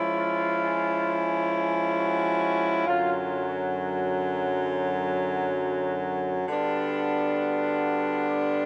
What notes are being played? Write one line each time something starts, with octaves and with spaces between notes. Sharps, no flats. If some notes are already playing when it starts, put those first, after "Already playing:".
Already playing: F3 G#3 C#4 E4
F4
F#4
F#2 D3 F#3 F4
F4
F#4
F#4
D3 G3 B3 D4 F4
F#4
G4